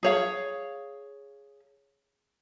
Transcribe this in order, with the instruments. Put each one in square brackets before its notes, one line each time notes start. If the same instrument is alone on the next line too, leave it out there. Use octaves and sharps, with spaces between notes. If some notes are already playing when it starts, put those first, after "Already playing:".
[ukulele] G#4 C#5 F5